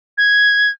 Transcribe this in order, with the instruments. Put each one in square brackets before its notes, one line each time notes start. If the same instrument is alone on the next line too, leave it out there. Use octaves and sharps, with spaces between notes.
[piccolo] G#6